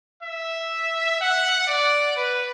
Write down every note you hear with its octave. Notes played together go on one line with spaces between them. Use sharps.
E5
F#5
D5
B4